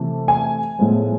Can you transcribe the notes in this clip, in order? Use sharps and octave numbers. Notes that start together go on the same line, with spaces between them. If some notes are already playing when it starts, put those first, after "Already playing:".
Already playing: C3 E3 A3
G#5
A2 F3 G#3 B3